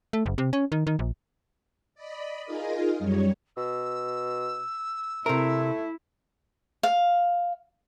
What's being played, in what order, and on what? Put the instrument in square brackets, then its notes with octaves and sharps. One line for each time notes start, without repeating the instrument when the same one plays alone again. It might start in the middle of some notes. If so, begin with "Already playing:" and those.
[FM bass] A3
F#1
C3
C#4
D#3
D#3
A#1
[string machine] D5 D#5 B5
D#4 F4 G#4 A#4 D#5
F#2 G3 C#5
[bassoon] B2 [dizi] E6
[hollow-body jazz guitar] C3 A#4 [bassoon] A3 [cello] E4
[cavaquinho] F5